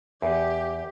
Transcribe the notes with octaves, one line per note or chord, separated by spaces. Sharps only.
E2 G4